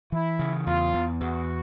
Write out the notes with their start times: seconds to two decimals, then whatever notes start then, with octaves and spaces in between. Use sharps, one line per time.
0.12 E3 E4
0.39 C#3
0.66 E2 F4
0.94 E2
1.21 E2 F#4